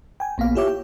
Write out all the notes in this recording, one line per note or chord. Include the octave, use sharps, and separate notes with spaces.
G5 G#5
A#1 A#3 B3 F5
E4 F4 G4 C#5 E5 D6
G5